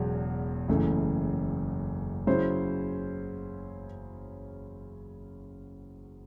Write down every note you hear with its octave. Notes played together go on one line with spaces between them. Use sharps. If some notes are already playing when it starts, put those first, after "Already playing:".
Already playing: E1 E2 C#3 F#3
F#1 F#2 E3 A3
C#3 F#3 C#4 E4 C5